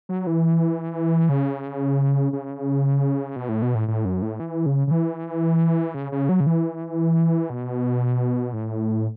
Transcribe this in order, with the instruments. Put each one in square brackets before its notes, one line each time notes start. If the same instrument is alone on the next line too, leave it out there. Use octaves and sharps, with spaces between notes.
[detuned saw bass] F#3
E3
C#3
C#3
B2
A2
B2
A2
A2
F#2
A2
E3
C#3
C#3
E3
C#3
C#3
F#3
C#3
E3
B2
A2